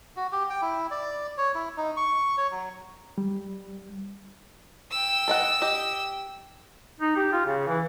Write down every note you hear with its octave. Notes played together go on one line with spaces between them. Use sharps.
F#4
G4
G5
E4
D5
C#5
E4
D#4
C#6
C#5
F#3
G3
G5 E6
A4 D#5 F#5
G4 D#5
D#4
G4
F4
C#3
E3